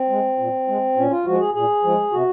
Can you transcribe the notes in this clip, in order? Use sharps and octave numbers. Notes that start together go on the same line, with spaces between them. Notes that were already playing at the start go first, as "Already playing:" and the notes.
Already playing: C4
G#3
A#2
G#3
A#2 C#4
F4
F3 G#3 F#4
G#4
A#2 G#4
F3 G#3
C3 F#4